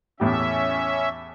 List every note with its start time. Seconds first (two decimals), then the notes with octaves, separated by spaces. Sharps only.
0.20 E2 A2 C#4 G4 E5